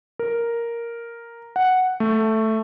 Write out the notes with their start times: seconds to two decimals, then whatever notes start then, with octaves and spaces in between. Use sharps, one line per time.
0.19 A#4
1.56 F#5
2.00 A3